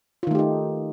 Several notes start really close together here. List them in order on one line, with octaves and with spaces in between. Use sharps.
F4 D#3 A3 G4 D#4